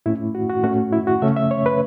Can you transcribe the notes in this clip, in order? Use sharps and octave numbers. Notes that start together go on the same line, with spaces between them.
A2 A3 C#4 E4
F#4
F#4
A2 A3 C#4 F#4
E4
F#4
C#3 A3 C#4 E5
E5
C#5
B4